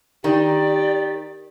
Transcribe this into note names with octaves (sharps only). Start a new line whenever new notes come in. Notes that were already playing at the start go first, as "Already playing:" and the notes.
D#3 G4 D5